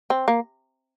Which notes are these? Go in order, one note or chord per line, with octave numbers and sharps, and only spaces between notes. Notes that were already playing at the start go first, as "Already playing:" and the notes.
C4
A#3